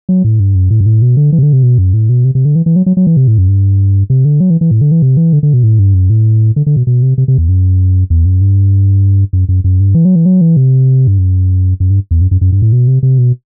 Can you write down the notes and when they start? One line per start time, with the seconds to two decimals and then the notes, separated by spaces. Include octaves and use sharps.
0.09 F#3
0.24 A2
0.40 G2
0.55 F#2
0.70 A2
0.81 G2
0.86 A2
1.02 B2
1.17 D3
1.32 E3
1.39 C3
1.43 D3
1.53 C3
1.63 B2
1.78 F#2
1.94 A2
2.09 B2
2.25 C3
2.35 C3
2.45 D3
2.56 E3
2.66 E3
2.76 F#3
2.86 F#3
2.97 F#3
3.07 E3
3.17 C3
3.28 A2
3.38 F#2
3.48 G2
4.10 C3
4.25 D3
4.40 F#3
4.50 E3
4.61 E3
4.71 A2
4.81 D3
4.92 E3
5.02 C3
5.17 E3
5.33 D3
5.43 D3
5.53 B2
5.63 A2
5.79 G2
5.94 F#2
6.10 A2
6.56 D3
6.66 D3
6.76 B2
6.87 B2
7.03 C3
7.18 C3
7.28 C3
7.38 E2
7.48 F#2
8.10 E2
8.25 F#2
8.41 G2
9.33 F#2
9.49 F#2
9.64 F#2
9.80 G2
9.95 E3
10.05 F#3
10.16 E3
10.26 F#3
10.41 E3
10.57 C3
11.07 G2
11.18 F#2
11.80 F#2
11.90 G2
12.11 E2
12.21 F#2
12.31 F#2
12.41 F#2
12.52 G2
12.62 A2
12.72 B2
12.87 C3
13.03 C3
13.18 B2